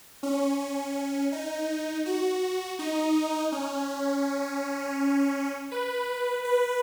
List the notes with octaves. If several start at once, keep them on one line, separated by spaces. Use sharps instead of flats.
C#4
C#4
D#4
F#4
D#4
C#4
B4
B4